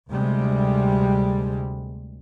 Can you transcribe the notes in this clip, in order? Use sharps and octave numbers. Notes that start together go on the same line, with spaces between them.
D2 C3 G3 G#3